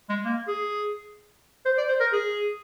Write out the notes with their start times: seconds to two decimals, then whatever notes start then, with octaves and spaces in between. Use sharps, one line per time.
0.09 G#3
0.25 A#3
0.48 G#4
1.66 C5
1.78 D5
1.89 C5
2.00 A#4
2.13 G#4